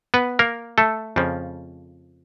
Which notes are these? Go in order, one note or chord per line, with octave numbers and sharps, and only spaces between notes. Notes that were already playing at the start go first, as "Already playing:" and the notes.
B3 B4
A#3 A#4
A3 A4
F2 C#3 F3